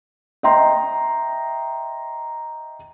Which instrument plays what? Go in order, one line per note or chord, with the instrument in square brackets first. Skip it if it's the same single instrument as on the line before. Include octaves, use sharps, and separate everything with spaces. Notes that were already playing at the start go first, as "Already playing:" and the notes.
[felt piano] D#5 E5 G5 A#5 C6